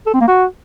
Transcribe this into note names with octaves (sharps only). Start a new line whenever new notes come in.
A4
C4
A#3
F#4